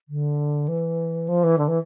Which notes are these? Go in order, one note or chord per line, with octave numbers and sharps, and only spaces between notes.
D3
E3
F3
E3
D3
E3